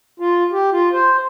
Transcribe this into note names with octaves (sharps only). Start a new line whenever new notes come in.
F4
G4
F4
C5